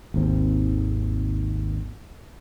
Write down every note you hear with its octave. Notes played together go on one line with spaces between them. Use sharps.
G#1 D#2 C4